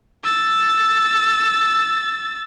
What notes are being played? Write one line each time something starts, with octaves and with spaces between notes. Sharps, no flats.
E6 A6